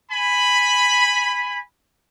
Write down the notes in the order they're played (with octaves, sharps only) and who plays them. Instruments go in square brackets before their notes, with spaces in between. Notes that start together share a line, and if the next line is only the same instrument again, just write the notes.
[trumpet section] G#5 B5